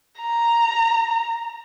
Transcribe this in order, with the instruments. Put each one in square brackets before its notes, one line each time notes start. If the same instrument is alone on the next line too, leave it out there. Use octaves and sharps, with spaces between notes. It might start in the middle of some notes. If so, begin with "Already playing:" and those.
[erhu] A#5